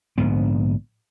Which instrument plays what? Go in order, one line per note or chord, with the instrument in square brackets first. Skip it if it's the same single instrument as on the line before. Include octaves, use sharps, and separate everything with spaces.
[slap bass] A#1 G#2 D3 B3